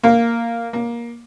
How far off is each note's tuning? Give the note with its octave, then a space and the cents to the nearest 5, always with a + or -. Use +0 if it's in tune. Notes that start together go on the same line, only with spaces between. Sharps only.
A#3 -5
A#3 +15